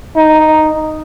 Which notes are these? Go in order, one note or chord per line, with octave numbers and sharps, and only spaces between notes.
D#4